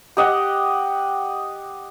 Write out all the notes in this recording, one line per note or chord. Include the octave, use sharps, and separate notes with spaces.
G4 D#5 F#5